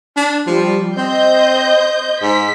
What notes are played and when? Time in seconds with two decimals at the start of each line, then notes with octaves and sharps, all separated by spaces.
0.16 D4
0.46 F3 G3
0.97 C4 C5 D#5 G6
2.22 G#2 B6